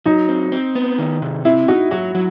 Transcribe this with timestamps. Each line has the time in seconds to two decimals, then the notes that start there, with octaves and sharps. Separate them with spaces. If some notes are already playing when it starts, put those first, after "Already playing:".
0.06 F#3 D#4
0.29 C4
0.52 C4
0.75 B3
0.99 D#3
1.22 C3
1.45 C4 E4
1.68 D#4 F#4
1.91 F#3 F#4
2.15 F#3